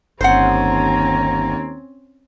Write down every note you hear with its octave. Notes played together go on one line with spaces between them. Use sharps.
G1 D#2 C4 C#4 C5 F#5 A#5